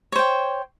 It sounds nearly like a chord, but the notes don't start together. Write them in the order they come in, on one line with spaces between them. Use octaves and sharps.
C#5 C5 G5